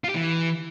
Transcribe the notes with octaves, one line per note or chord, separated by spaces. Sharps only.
F4
G4
E3